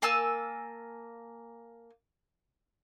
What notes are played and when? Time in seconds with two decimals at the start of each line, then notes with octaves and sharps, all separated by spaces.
0.02 A#3 G#5 A5 E6